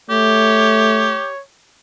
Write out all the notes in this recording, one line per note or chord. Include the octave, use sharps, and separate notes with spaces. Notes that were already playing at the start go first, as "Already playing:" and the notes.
A3 G4 C#5